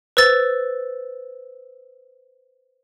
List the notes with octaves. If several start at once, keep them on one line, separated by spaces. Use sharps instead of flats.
B4 C5 E6 A6